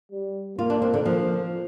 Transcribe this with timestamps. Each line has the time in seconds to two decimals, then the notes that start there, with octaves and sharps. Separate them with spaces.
0.12 G3
0.58 A#3 F4
0.70 D4
0.82 C4
0.94 D3
1.05 F3 A#3